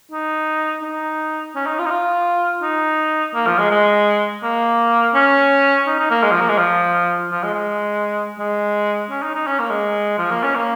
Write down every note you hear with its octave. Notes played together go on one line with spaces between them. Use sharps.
D#4
D#4
C#4
D#4
F4
D#4
F4
D#4
A#3
F3
G#3
G#3
A#3
C#4
D#4
D#4
A#3
G#3
F3
A#3
G#3
F3
F3
G#3
G#3
G#3
C#4
D#4
D#4
C#4
A#3
G#3
F3
A#3
C#4
A#3